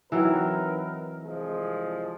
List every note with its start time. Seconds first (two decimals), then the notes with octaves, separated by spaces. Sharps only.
0.12 E3 F#3 C4 D#4 A#4 B4
1.24 C2 F3 G#3